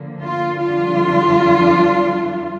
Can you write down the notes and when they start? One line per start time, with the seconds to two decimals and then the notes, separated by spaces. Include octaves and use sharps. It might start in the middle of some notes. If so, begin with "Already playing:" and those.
Already playing: D3 F3 A#3
0.22 F4
0.64 F2 D3 G3 D4 F4